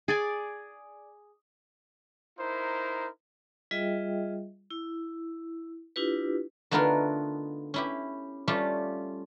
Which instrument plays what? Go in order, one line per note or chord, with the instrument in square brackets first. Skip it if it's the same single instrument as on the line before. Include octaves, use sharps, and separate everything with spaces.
[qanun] G#4 D5 G#5
[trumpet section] D#4 E4 A#4 C5
[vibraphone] G3 F4 G#4 D#5 E5 G5
E4
D4 E4 F4 G4 B4
[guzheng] D3 A3 B3 D#4 F4 A#4
C#4 E4 G4
G3 A3 C#4 F4 G4